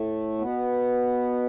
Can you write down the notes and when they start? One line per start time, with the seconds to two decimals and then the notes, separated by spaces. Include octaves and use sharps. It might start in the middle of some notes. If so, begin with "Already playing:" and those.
Already playing: A2 A3
0.39 B2 B3